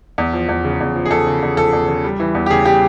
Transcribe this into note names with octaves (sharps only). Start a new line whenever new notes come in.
E2
F3
E2
C#3
E2
F3
G#4
E2 A4
C#3
E2
F3 A4
E2
C#3
G3
E3
E2
G4
C#3 G#4
G3 G4